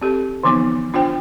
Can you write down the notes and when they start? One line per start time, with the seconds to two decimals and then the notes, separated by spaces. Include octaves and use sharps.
0.01 C4 G4 A4
0.44 D3 E3 F3 B3 D#4
0.94 D4 F4 C5 G5